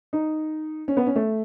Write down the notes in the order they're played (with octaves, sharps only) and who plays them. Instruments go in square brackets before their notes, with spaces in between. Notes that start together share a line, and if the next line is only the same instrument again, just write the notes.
[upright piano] D#4
C#4
B3
C#4
A3